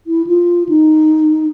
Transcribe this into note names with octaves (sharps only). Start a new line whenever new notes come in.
E4
F4
D#4